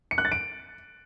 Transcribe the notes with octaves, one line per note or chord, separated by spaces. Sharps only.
C#7
F#6
A6
D7